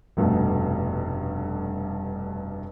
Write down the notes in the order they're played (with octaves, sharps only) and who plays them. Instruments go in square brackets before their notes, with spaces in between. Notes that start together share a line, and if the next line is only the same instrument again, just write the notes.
[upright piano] F1 G2 B2 A3